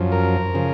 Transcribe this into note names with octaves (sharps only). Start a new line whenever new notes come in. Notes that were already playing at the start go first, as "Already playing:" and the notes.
Already playing: F#2 F3
A#4
C#3 F3